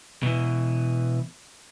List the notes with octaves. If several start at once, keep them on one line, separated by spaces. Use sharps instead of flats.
B2 E3